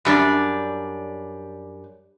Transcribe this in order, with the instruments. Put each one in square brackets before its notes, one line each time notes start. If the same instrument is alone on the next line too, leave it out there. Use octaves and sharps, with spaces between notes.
[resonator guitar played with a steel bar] F#2 G3 D4